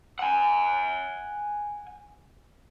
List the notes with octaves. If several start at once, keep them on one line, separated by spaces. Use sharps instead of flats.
F#5 G#5